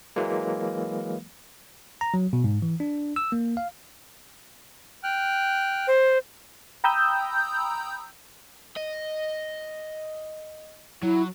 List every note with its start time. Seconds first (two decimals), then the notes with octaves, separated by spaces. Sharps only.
0.16 E3 F#3 G#3 A#3
2.01 A#5
2.14 F#3
2.33 B2
2.44 G#2
2.62 E3
2.80 D4
3.16 E6
3.32 A#3
3.57 F5
5.03 G5 F6 F#6
5.87 C5
6.84 G5 A#5 B5 D#6 E6 G6
8.77 D#5
11.03 F#3 E4